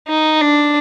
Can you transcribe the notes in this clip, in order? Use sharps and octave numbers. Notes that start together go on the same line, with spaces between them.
D#4
D4